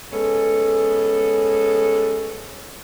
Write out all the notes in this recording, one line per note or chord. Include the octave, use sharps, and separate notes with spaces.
G#3 B3 C#4 A4